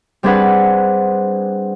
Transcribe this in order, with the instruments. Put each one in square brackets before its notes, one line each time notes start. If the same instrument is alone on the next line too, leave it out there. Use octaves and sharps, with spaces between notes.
[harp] G3 C4 D4 G#4 B4 F#5